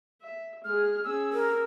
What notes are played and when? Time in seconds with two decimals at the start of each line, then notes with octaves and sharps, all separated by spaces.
0.22 E5
0.64 G#3 G#4 F6
1.04 C#4 G#4 E6
1.32 A#4 E6